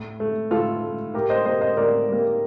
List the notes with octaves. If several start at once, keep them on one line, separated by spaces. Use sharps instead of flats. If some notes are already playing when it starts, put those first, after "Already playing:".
Already playing: A2
A3
A2 F4 A4
A3
A2 G4 A#4
C5 D#5
G3 A#3 C5 D#5
C5 D#5
A2 A#4 D5
G3 A#3